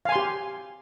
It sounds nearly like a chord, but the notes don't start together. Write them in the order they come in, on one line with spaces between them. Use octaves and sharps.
F5 G#5 C6 G4